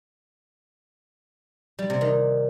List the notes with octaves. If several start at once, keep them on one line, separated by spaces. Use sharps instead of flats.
G3
C3
D#3